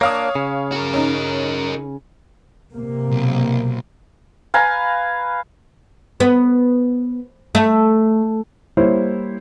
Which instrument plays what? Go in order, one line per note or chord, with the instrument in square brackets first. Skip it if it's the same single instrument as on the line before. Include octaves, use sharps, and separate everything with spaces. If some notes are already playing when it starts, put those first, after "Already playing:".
[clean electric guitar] A#3 D4 [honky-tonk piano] C#5 F5 D#6
[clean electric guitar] C#3
[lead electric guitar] F#4 A#4
[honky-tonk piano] C#4 D#4
[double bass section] C3 A#3
[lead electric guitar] B1
[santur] B4 F5 G#5 A#5
[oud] B3
A3
[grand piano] G3 A#3 E4 C5 C#5